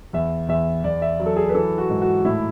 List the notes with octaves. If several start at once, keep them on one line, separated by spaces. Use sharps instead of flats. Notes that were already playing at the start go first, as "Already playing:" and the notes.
E2 E5
E2 E5
E2 D5
E5
F#3
A4
G#4
B4
E3 A4
F#4
G#2
F#4
A2 E4